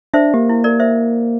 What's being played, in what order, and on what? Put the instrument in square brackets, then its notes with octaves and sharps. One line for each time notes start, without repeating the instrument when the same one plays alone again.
[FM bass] D4 [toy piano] C5 E5
[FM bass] A#3 [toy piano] G4
[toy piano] E4
A#4 D5
C5 E5